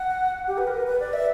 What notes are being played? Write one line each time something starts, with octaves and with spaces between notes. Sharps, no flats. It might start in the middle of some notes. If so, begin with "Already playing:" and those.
Already playing: F#5
G4
B4
A#4
B4
B4
D5
E5